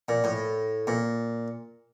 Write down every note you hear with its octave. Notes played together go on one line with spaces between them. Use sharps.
A#2
A2
A#2